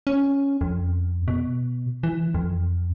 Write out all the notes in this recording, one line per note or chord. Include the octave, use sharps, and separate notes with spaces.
C#4
F2
B2
E3
F2